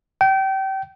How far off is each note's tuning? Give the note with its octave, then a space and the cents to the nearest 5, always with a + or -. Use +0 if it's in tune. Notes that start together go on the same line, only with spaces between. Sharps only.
G5 -30